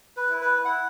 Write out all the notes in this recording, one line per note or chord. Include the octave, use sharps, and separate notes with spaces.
B4
E4
B4
E4 F#5